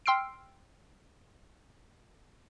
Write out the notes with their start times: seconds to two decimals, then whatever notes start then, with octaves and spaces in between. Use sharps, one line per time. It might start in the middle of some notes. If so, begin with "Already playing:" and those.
0.06 G5 C6 E6 F6 C7 D7